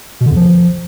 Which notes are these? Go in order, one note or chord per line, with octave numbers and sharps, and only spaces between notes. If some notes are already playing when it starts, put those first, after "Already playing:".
B2
D3
E2
F3